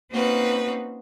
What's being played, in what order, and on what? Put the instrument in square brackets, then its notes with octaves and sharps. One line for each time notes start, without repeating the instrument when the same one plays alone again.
[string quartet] A#3 C4 C#4 D#4 F#4 B4